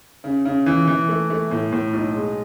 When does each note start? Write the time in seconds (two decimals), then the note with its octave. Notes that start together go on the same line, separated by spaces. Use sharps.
0.24 C#3
0.45 C#3
0.66 E3
0.87 E3
1.09 A3
1.30 A3
1.51 A2
1.72 A2
1.93 B1
2.15 G#3